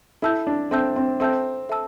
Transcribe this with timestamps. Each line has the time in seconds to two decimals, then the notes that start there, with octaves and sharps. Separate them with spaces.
0.22 E4 A4 E5 A5 E6 G6
0.47 D4
0.71 C4 A4 E5 A5 E6 G6
0.96 C4
1.20 C4 A4 E5 A5 E6 G6
1.69 A4 E5 A5 E6